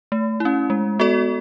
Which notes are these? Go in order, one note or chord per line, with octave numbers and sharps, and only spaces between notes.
A3
C#4 E4
G#3
B3 F#4 A4 D5